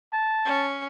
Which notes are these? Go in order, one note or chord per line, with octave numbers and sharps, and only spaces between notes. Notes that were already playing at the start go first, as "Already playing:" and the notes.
A5
C#4